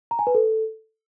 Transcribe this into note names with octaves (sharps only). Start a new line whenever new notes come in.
A#5
G#5
B4
A4